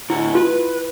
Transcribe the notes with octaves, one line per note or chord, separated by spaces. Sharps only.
A2 D3 E4 F#5
F4 B4